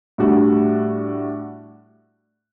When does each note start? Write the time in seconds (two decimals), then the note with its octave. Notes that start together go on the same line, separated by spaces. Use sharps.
0.18 A2 G3 D4 F#4